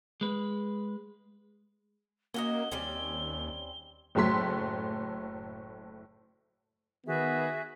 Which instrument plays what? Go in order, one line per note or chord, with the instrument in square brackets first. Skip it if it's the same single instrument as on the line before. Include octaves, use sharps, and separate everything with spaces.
[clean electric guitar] G#3 B4
[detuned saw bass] A#3 [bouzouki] C#4 F#4 D#5 [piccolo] G7
[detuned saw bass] D#2 [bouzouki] G3 C4 C#4
[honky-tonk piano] F#1 A2 F#3 A3 C6 B6
[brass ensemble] D#3 B3 [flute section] F#4 G#4 E5